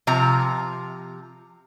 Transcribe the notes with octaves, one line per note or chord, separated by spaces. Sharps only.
C3 F3 A#5